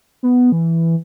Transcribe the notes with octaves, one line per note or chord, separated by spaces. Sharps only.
B3
E3